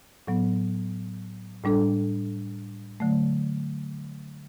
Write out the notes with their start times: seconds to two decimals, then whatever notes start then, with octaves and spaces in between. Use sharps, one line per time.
0.27 A2 F#3 B3
1.64 A2 G3 D4 A4
3.00 D3 F#3 A3